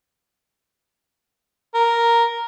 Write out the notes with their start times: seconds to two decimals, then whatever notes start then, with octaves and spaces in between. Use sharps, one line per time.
1.75 A#4